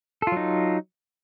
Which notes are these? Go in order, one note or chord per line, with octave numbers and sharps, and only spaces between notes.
F#3 D#4 F4 A4